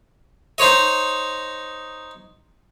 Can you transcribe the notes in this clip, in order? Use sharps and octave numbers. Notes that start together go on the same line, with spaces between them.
D#4 C5 C#5 D#5